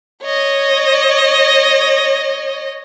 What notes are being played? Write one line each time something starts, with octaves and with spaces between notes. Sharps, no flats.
C#5 D#5